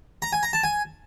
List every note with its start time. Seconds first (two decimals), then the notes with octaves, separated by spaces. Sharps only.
0.22 A#5
0.33 G#5
0.43 A#5
0.53 A5
0.64 G#5